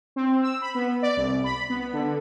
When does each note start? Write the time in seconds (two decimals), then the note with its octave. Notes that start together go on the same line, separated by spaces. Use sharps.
0.16 C4
0.43 E6
0.62 B5
0.75 B3
1.02 D5
1.17 C2
1.44 B5
1.70 B3
1.93 D3